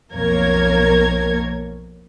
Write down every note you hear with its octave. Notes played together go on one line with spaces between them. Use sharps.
B1 F2 A#3 A#4 C#5 G#6